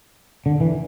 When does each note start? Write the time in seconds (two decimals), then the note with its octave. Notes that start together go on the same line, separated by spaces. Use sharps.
0.46 D3
0.60 E3